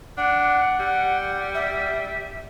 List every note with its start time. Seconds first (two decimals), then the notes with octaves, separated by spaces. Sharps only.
0.18 D4 F#5
0.80 G3
1.54 E5